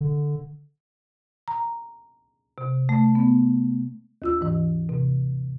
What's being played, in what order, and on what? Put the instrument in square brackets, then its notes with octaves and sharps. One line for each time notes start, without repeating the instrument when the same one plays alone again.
[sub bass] D3
[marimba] A#5
C3
A3
B3
D#2 F4 E6
G#2 E3
C3